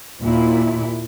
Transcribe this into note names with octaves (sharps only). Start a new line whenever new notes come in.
D#2 A#2 E4